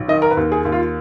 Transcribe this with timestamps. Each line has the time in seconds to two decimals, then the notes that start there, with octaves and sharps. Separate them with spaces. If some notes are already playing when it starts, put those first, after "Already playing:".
Already playing: B1
0.08 D#3 D#5
0.22 A#4
0.31 B4
0.37 D#2
0.52 G#4
0.65 D#2
0.72 F4